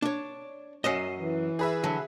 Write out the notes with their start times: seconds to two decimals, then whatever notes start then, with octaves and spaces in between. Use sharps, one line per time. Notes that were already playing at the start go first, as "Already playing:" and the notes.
0.02 D4 C#5
0.84 F#2 F#3 C#4 D#5 C7 D#7 E7
1.18 E3
1.59 G#4 B4 E5
1.84 D3 F#3